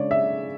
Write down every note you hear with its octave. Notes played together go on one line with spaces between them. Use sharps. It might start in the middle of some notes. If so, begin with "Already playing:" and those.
Already playing: C#3 G#3 D4 C#5 D5
E5